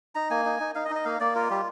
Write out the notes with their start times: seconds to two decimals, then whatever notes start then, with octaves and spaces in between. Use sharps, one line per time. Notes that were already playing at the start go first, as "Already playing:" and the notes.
0.15 D#4 A#5
0.30 A#3 G#5
0.46 D#4
0.60 D#4
0.75 D#4 F5
0.85 D#5
0.90 D#4
0.96 D#5
1.05 A#3 F5
1.20 A#3 D5
1.35 F4 A#4
1.50 G3 G4